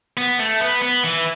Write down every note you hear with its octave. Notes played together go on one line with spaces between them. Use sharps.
B3
A3
B3
B3
E3